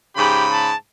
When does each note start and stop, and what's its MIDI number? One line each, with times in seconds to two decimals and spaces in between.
0.16 0.70 44
0.16 0.70 49
0.16 0.45 67
0.16 0.70 83
0.51 0.77 81